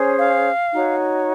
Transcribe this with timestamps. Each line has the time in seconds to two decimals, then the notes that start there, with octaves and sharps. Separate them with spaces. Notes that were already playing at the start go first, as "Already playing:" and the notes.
Already playing: C#4 G#4 C5
0.18 F5
0.73 D#4 F#4 C#5